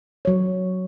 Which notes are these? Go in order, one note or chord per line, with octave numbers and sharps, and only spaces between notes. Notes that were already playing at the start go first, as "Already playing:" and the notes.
F#3 C#5